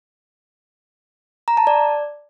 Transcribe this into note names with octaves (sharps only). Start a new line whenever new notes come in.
A#5
A5
D5